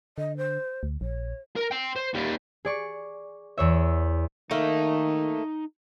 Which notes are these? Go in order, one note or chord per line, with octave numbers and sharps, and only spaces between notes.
D3 D#5
C5
D2
A#1 C#5
A#4
G5 C6
C5
D#2 G3
G#4 D5 C#6
E2 C#5 E5
D#3 A3 A#3 D#4